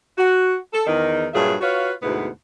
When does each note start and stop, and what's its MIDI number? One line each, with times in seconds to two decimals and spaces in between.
0.18 0.55 66
0.73 0.83 69
0.87 1.28 40
0.87 1.28 51
0.87 1.28 63
1.33 1.55 43
1.33 1.55 46
1.33 1.55 54
1.33 1.55 65
1.33 1.55 68
1.33 1.55 76
1.61 1.92 65
1.61 1.92 66
1.61 1.92 71
1.61 1.92 73
1.61 1.92 77
2.02 2.27 38
2.02 2.27 44
2.02 2.27 47
2.02 2.27 59
2.02 2.27 64
2.02 2.27 78